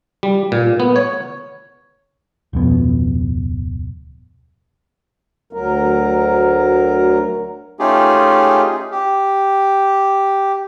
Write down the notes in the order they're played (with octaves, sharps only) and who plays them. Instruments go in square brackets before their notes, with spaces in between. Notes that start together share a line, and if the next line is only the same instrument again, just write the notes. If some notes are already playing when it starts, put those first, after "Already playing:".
[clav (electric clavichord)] G3
A#2
B3
C#5
[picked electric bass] D1 F2 B2
[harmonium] D2 F#3 A#4
[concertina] A3 C#4 D#4 F4 G4 G#4
G4